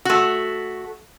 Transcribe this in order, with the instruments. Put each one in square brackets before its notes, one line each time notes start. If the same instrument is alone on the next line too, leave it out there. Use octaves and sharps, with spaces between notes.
[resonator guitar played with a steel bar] A3 F#4